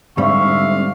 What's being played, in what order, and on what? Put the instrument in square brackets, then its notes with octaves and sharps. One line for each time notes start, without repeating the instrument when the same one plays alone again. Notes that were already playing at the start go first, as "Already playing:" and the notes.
[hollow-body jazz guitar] G#2 G3 [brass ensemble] D3 D5 F5 [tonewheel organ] C4 [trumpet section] E5 C#6